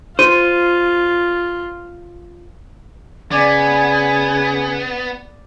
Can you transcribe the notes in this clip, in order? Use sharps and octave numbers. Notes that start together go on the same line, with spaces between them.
F4 C5 D#7
C#3 B3 D5 G#5 G#6